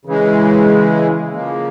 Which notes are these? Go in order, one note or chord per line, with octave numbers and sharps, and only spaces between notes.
C#3 E3 G#3
C#3 F3 A#3